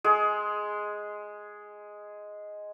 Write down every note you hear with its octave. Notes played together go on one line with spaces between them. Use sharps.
G#3 G#4